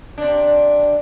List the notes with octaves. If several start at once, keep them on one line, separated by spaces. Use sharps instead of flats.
C3 D4